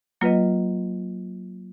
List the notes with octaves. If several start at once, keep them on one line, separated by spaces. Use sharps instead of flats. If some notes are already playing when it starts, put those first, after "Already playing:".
F#3 A#3 F4 B4 D#5